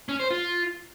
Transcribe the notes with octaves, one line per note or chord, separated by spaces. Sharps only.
C#4
C5
F4